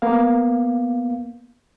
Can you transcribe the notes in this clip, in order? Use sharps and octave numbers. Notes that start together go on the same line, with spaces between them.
A#3 B3 F5